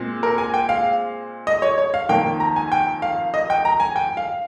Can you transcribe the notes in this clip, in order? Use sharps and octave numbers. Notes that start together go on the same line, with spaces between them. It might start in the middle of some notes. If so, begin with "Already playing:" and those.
Already playing: A#2 G#3 C4
A#4
G#5
G5
F5
D#5
C#5
C#5
F5
F2 D#3 A#3 G5
A#5
G#5
G5
F5
D#5
G5
A#5
G#5
G5
F5